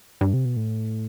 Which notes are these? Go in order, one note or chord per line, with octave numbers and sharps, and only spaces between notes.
G2
C3
B2
A2